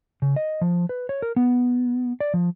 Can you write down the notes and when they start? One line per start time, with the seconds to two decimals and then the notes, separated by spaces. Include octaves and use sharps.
0.22 C#3
0.36 D#5
0.61 F3
0.89 B4
1.09 C#5
1.22 A#4
1.36 B3
2.20 D5
2.34 F3